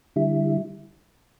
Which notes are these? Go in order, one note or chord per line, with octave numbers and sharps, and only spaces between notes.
D3 G3 E4